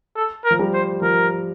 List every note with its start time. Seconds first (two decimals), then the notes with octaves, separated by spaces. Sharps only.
0.16 A4
0.45 A#4
0.51 F3
0.59 G3
0.73 C5
1.02 F3 A#4